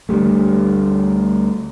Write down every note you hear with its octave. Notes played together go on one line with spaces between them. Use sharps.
D2 G3 A3